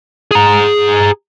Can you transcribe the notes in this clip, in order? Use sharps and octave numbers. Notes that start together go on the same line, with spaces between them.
G#4 A#5